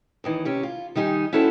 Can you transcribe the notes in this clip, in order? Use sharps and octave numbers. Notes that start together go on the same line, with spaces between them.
D#2 D#3 E3
C3 C#4 G4
F4
D#3 G3 D#4 G4 G#5
C#4 E4 F#4 A4 C5 G5